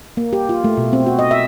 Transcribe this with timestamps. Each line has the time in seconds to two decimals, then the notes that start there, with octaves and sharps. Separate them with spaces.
0.17 A#3
0.33 G4
0.49 F4
0.64 A3
0.77 B2
0.93 C4
1.06 F#4
1.19 D#5
1.31 E5